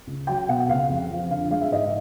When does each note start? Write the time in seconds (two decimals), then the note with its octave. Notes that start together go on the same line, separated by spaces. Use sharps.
0.07 C#2
0.27 F#3 G5
0.49 B2 F#5
0.68 C#2 F5
0.89 F2
1.10 F3
1.30 D3 F5
1.51 G#3 F5
1.61 E5
1.72 G#2 D#5